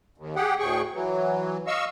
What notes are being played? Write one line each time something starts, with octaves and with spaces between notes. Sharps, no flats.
D#2
G4 G#4 F#5 G5
D2 A2 G#4 G5 C#6
E3 F#3
D#5 F5 C#6 E6